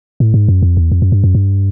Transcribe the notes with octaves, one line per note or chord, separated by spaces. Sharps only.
A2
G#2
F#2
F2
E2
F2
F#2
G2
F#2
G2